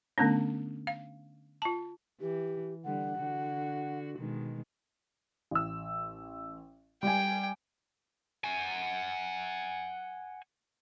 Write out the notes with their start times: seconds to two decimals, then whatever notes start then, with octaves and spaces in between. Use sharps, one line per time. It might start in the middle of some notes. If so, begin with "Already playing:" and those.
0.18 D3 A3 B3 C#4 D4
0.87 F5
1.62 F4 A5
2.20 E3 G4
2.85 D3 G3 F#5
3.17 D3 F#4
4.17 B2 D#3 G#3
5.51 A1 E6
7.03 G3 G5 G#5
8.44 F#5 G#5